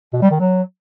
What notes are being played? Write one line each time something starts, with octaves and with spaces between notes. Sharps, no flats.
B2
G3
D#3
F#3